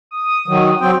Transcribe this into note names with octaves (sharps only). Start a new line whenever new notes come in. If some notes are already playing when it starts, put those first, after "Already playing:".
D#6
D#3 F#3
F#3 C4 G5